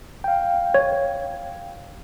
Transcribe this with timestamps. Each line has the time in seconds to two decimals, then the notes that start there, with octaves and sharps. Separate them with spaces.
0.24 F5 G5
0.74 C#5